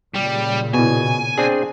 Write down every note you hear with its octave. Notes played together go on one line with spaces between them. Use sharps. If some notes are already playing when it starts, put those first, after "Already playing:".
A#2 C#3 G3
B2 B3 E4 G#5
C4 D4 G#4